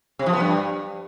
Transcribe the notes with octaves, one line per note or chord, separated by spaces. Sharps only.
C3
F3
B3
G2